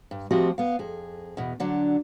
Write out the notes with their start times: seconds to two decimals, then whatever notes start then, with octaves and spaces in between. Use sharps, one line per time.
0.11 G2
0.31 F3 A3 C4 F#4 G4 D#5
0.58 B3 F5
0.79 F2 G#4
1.37 E2 B2
1.60 D3 F#3 D4